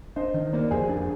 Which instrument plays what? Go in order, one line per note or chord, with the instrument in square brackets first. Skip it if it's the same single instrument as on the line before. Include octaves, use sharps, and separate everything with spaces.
[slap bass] D4 [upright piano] C5 D#5
[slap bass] D#3
[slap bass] A#3 [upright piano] A#4 D5
[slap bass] F2 [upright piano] G#4 C5
[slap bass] D4 [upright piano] G#4